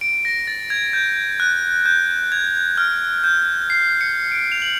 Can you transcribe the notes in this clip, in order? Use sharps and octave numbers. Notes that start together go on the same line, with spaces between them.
D7
A#6
A6
G#6
G6
F#6
G6
G#6
F6
G6
C7
C#7
D7
F7
F#7